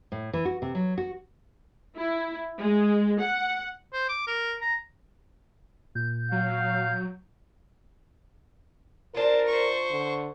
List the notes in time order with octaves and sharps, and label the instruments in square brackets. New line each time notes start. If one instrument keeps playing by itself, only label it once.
[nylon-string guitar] A2
E3
F#4
C3
F#3
F#4
[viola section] E4
G#3
F#5
[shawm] C5
D6
A#4
A#5
[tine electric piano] A#2 [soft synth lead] G6
[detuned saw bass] F#3 [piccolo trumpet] F5
[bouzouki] D4 F4 [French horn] A#4 [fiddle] C5 A5
[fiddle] C5 C#6
[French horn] D3